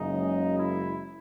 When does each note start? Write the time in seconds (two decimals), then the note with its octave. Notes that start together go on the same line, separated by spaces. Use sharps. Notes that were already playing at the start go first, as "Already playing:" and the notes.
Already playing: F#1 F#2 C#3 G#3 D#4
0.59 E4